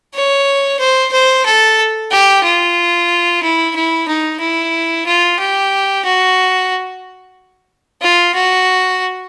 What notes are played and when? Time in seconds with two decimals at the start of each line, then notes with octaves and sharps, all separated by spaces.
0.14 C#5
0.79 C5
1.12 C5
1.45 A4
2.11 G4
2.43 F4
3.42 E4
3.75 E4
4.08 D#4
4.40 E4
5.06 F4
5.39 G4
6.04 F#4
8.01 F4
8.34 F#4